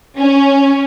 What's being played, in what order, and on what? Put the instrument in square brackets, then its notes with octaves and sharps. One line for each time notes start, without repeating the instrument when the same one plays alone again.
[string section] C#4